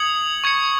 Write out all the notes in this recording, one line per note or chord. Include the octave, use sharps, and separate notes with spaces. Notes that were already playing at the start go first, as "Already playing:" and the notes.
Already playing: D#6 G#6 C#7 F#7
C#6 G#6 C#7